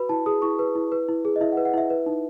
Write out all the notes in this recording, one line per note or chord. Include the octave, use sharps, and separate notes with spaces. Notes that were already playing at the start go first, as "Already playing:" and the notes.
Already playing: F#4 B4 B5
E4 A5
G#4 D#6
E4 C#6
B4
E4
B4
E4
G#4
D#5
E4 E5
F#5
B4
F#5
E4 E5
B4
D#4